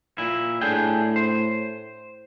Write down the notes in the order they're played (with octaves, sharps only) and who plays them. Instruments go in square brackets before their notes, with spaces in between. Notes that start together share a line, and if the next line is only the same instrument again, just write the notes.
[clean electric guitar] A#2 E4
[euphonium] A2 [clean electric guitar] D4 G#4 G5
[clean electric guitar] C5